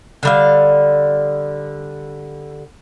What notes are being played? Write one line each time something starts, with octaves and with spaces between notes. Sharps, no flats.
D3 G3 F5